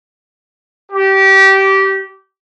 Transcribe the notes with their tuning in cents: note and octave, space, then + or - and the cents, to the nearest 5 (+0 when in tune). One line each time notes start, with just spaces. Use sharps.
G4 -20